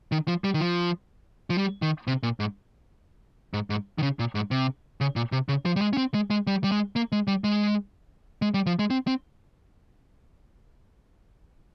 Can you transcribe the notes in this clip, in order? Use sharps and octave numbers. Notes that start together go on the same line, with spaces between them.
D#3
F3
G3
D#3
F3
F3
G3
D#3
C3
A#2
G#2
G#2
G#2
D#3
C#3
A#2
G#2
C3
C#3
A#2
C3
C#3
F3
G3
G#3
C#4
C4
G#3
G#3
G3
G3
G#3
A#3
G#3
G3
G#3
G#3
G3
F3
G#3
C4
C4